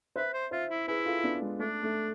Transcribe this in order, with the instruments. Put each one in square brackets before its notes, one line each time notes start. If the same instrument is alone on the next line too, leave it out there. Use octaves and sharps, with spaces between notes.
[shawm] B4 [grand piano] C5 E5
[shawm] C5
[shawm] F4 [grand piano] C5 E5
[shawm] E4
[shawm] E4 [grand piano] G#4 B4
[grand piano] F4 A4
B3 D4
G#3
[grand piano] A3 [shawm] D4
[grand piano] A3